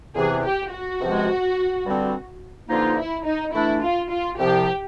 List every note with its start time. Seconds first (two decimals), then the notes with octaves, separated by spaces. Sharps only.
0.15 E2 C3 E3 G#4
0.43 G4
0.71 F#4
1.00 C#2 C3 F3 G#3
1.84 G2 D3 G3 C4
2.69 G2 D3 F3 A#3 D#4 F4
2.97 E4
3.24 D#4
3.53 E3 A3 D4 E4
3.81 F4
4.10 F4
4.38 C2 C3 F3 G4